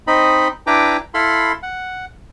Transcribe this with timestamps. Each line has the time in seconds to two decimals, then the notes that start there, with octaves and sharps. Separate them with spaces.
0.07 C4 D#4 D#5 B5
0.67 D4 E4 B4 G5 A#5 D6
1.14 E4 A4 F5 B5 C6
1.63 F#5